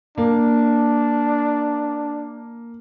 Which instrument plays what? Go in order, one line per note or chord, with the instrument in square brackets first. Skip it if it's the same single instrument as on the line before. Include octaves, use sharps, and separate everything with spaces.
[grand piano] A#3 [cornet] D4